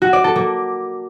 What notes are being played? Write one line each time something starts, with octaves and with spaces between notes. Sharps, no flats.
F#4
D5
A4
A#3